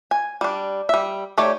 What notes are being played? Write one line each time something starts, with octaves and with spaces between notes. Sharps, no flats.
G#5
G3 D4
G3 E5
A3 D#4 G4 C#5 D5